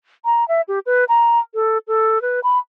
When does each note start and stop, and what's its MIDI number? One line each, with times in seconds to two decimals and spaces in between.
0.25 0.47 82
0.48 0.61 76
0.68 0.79 67
0.86 1.05 71
1.09 1.39 82
1.54 1.78 69
1.88 2.21 69
2.22 2.40 71
2.43 2.58 83